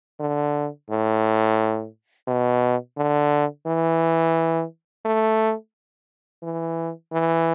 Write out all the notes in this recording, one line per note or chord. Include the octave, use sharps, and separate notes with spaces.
D3
A2
B2
D3
E3
A3
E3
E3